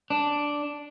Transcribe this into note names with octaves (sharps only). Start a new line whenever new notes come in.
D4